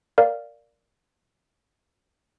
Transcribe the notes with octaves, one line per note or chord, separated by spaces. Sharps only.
A#4 D5 F5